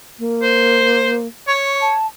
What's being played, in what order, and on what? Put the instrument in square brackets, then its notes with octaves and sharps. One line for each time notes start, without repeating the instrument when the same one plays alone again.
[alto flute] A#3
[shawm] C5
[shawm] C#5 [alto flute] C#6
[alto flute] A5